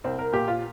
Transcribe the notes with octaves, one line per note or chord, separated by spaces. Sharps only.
C2 C4
A#4
A#2 G4
F4